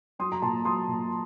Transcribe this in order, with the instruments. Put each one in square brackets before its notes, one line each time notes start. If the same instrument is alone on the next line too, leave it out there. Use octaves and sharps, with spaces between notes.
[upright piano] F#3 C6 D#6
A#5
A#2 A5 C6
F#3 C6 D#6
A#2